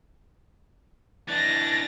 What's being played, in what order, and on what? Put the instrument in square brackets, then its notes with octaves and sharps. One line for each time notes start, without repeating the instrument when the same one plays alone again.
[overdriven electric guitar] E3 D4 [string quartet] A6 A#6